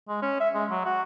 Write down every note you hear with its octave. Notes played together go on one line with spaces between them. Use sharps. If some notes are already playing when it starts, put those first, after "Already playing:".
G#3
C#4
E5
G#3
F#3
F#4